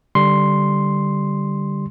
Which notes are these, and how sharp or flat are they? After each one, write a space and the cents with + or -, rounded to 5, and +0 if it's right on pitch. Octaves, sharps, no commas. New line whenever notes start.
D3 +0 G3 +0 C6 +0